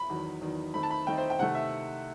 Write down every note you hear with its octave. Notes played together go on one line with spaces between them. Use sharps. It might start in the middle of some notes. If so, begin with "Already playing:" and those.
Already playing: B5
E2 D#3 F#3
E2 D#3 F#3
D#3 A3 C4 D#4 B5
A5
B5
D#3 A3 C4 D#4 G5
C5
G5
C3 D#3 A3 F#5
E5